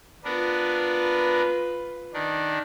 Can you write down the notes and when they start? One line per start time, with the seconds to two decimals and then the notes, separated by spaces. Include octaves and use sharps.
0.24 B3 D4 F4 A#4 B4
2.14 D#3 D4